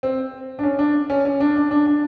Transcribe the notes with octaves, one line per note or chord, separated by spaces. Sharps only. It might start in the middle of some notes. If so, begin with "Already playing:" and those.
C4
D4
C#4
D4
C#4
C#4
D4
D4
D4
D4